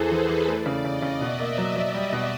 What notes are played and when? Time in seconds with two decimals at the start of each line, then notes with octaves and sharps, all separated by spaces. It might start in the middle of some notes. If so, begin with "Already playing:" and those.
Already playing: E2 E3 G#4 A4 C5
0.11 E3 B4
0.29 E3
0.47 A3 D5
0.66 C#3
0.84 C#3 D#5
1.02 C#3
1.21 B2 E5
1.39 A#3
1.58 F#3
1.76 F#3
1.94 G3
2.12 B2